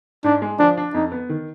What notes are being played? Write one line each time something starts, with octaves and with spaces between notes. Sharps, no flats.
G#2 D4
G#3
F3 D4
D4
F2 D#4
B3
D#3